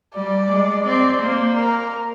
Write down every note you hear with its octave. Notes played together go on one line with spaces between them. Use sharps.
G3 D5
G#3
C4 D5
A#3 C5
A#4